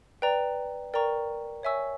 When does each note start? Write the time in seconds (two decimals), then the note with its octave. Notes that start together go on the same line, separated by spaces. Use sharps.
0.22 B4 D5 G5 A#5
0.94 A#4 D5 G5 A#5 C#6
1.63 C#5 E5 G#5 C#6 E6